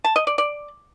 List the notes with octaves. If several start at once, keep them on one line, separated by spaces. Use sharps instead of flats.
A5
D#5
D5
D5